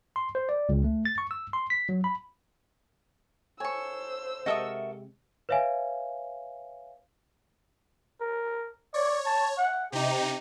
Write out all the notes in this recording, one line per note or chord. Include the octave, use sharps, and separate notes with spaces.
C6
C5
D5
C#2
A3
A6
C#6
E6
C6
B6
F#3
B5
A4 C5 C#5 G#5 A5 C#6 E6
C3 G#3 F#4 A4 A#4 D#5 E5 D#6
B4 C#5 E5 F5 G#5
A#4
C#5 D5
A5
F#5
C3 D#4 G4